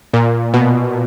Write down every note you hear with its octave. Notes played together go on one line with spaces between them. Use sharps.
A#2
B2